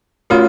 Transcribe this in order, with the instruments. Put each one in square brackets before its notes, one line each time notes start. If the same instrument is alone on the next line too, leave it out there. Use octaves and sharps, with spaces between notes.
[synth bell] A3 C#4 F#4 A#4 C#5 [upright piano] F4